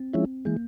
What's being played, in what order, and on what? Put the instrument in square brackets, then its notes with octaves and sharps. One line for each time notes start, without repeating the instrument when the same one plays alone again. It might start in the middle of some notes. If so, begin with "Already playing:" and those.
Already playing: [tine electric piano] C4
[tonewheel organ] F3 G#3 C#4 E4
[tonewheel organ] E3 G#3 [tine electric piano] A#3